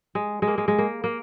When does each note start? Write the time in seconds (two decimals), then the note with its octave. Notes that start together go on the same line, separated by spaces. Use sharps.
0.15 G#3
0.42 G#3
0.47 A#3
0.58 G#3
0.68 G#3
0.78 A#3
1.04 A#3